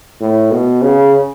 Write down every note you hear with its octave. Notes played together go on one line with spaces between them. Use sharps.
A2
B2
C#3